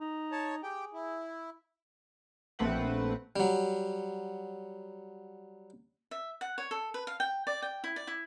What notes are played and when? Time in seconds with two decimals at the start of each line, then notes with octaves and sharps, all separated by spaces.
0.01 D#4
0.32 C#5 A5
0.63 G4 G#4 G5
0.94 E4
2.59 A#1 A3 C4 B4 F#5
3.36 F#3 G3
6.11 E5
6.41 F#5
6.58 C#5
6.71 A4
6.94 B4
7.07 F5
7.20 G5
7.47 D5
7.62 G5
7.84 E4
7.96 D5
8.07 E4